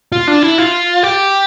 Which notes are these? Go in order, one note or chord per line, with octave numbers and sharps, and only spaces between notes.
F4
D4
E4
F4
G4